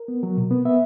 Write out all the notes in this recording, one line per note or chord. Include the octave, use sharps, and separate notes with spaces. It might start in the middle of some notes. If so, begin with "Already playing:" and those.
Already playing: A#4
B3
F#3
B2
B3
B3 E5